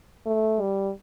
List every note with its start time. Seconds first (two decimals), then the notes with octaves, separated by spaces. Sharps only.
0.26 A3
0.61 G3